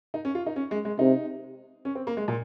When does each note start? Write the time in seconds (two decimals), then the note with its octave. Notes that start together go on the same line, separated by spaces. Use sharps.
0.14 D#4
0.25 C#4
0.35 F4
0.46 D#4
0.56 C#4
0.71 G#3
0.85 G#3
0.99 C3 D#4
1.85 C#4
1.95 C4
2.07 A#3
2.17 G#3
2.28 A#2